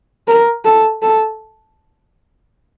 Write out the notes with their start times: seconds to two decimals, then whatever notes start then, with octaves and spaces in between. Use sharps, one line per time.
0.28 A#4
0.65 A4
1.02 A4